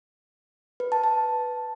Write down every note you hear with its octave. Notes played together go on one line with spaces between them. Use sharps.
B4
A5
A5